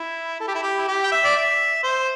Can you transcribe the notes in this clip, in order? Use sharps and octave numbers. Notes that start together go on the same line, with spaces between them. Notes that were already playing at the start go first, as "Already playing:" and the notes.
Already playing: E4
A4
G4
E4
G4
E4
G4
G5
E5
D5
E5
C5